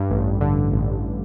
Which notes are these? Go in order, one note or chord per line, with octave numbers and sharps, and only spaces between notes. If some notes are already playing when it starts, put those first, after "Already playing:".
Already playing: G2
A1
D3
A1